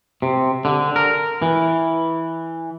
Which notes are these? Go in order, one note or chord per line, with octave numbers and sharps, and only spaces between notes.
C3
D3
A#4
E3